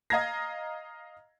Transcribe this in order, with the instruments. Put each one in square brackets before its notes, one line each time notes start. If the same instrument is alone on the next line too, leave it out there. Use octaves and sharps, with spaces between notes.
[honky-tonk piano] D#5 F5 A#5 G#6 A#6